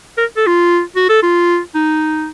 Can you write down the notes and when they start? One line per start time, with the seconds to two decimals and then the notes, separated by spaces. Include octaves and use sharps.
0.18 A#4
0.37 A4
0.47 F4
0.96 F#4
1.09 A4
1.22 F4
1.75 D#4